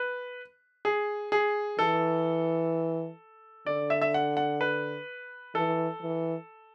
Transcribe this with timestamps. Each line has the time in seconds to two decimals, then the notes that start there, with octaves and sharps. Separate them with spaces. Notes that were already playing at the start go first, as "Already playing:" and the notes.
Already playing: B4
0.85 G#4
1.32 G#4
1.79 E3 A4
3.66 D3 D5
3.90 E5
4.02 E5
4.14 F#5
4.37 F#5
4.61 B4
5.55 E3 A4
6.02 E3